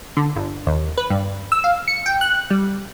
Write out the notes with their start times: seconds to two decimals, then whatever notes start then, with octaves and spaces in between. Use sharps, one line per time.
0.17 D3
0.36 G1
0.67 D#2
0.98 B4
1.10 G2
1.52 E6
1.64 F5
1.88 C#7
2.06 G5
2.21 F#6
2.50 G3